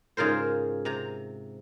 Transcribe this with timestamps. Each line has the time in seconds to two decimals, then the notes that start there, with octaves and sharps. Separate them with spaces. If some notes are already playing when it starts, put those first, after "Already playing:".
0.17 G#2 C#3 F4 A#4 C5
0.85 C3 A#5